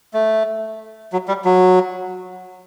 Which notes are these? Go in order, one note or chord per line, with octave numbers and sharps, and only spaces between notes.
A3
F#3
G3
F#3